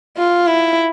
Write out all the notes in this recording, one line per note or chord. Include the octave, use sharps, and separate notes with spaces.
F4
E4